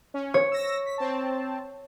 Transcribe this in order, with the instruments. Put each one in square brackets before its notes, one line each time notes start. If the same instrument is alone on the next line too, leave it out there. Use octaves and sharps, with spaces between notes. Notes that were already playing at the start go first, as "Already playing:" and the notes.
[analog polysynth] C#4
[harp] C#5
[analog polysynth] E6 A#6
B6
C4 A5